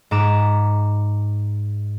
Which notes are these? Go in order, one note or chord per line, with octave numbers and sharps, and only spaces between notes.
G#2 A#5 D6 E7